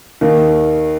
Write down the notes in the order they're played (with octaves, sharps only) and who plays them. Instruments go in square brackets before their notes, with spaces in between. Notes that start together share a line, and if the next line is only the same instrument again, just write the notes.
[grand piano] D#2 D#3